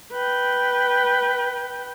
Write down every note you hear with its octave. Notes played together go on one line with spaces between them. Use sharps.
B4 G5